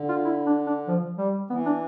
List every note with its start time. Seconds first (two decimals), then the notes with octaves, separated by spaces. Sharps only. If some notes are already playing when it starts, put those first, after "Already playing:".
Already playing: D3
0.09 F4
0.25 E4
0.46 D4
0.67 D4
0.87 F3
1.18 G3
1.50 E3 B3
1.66 D4